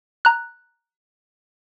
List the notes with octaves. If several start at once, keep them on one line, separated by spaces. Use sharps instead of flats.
A#5 F#6